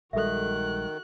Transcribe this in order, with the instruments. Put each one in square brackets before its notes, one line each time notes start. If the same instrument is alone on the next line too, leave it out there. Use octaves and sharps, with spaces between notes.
[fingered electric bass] A#1 G3 G#3 [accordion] D#3 [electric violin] F#4 F#6 [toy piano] A4 E5